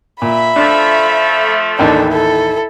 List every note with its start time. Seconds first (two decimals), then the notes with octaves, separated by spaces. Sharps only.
0.22 A#2 E5 B5
0.56 F3 A3 D4
1.79 A1 D#2 D#3 D4 A4
2.10 E4 A4